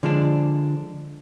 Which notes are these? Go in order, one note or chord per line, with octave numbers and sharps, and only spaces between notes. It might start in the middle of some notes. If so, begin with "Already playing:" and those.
D3 F3 G#3 D4